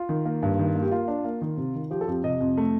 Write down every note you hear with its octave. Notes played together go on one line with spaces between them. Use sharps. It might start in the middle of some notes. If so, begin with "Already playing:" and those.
Already playing: F4
D#3
A#3
G2
D#3
A#3
G4
A#3 F4
D4
A#3
D#3
C3
D#3
F3 G4
A4
F2 G4
C3 D#5
F2
A3